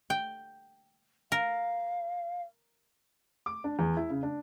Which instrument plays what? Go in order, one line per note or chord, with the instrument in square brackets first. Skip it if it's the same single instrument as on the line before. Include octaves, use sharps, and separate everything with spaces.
[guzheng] G5
[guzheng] A#4 [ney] F5
[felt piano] D6
D4
E2
E4
C#3
D4